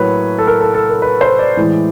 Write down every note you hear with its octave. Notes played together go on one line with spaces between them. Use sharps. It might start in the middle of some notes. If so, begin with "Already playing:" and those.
Already playing: A2 F#3 A#3 B4 C#5
A4
A#4
A4
A4
A#4
B4
C5
D5
A2 E3 G#3